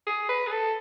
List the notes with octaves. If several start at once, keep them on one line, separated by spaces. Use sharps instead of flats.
G#4
B4
G#4
A4